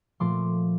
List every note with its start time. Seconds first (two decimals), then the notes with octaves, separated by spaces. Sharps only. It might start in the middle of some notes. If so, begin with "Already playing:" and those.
0.20 A#2 F3 A3 C6 D6